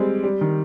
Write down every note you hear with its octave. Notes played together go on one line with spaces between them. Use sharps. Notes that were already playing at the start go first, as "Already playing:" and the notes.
Already playing: G3 G#3 C4
G3
D#3